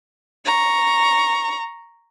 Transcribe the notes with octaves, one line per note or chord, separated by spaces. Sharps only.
A#5 C#6